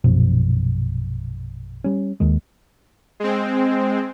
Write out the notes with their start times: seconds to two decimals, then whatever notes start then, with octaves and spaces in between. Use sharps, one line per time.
0.04 A#1 F#2 B2 F3
1.84 G3 C#4
2.20 D#2 D#3 G#3
3.20 G#3 C4